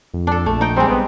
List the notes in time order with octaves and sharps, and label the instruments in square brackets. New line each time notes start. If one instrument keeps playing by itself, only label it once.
[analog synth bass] F2
[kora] D4 A4
[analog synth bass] A#1 [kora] A3
[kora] D#4 G5
[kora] G3 G#3 [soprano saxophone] C4
[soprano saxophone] B3